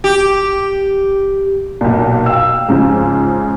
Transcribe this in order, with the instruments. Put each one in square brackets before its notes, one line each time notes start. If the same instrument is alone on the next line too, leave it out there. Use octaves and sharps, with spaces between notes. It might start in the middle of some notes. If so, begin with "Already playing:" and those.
[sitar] G4
[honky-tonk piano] B1 A#2
F5 G5 E6
G#2 C#3 F3